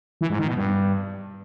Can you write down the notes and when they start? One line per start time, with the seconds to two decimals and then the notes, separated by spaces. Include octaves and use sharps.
0.21 E3
0.30 G#2
0.39 D#3
0.48 B2
0.57 G2